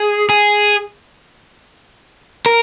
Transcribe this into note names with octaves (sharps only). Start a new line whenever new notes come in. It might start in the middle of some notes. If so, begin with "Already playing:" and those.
Already playing: G#4
G#4
A#4